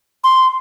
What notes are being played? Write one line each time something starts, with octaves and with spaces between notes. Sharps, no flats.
C6